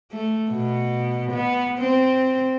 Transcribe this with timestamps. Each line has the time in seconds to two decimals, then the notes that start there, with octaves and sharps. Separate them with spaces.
0.11 A3
0.51 B2
1.32 B3
1.79 C4